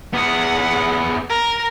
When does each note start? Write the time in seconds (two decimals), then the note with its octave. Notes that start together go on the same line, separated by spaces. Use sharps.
0.13 B3 G#4 F#5
1.29 A#4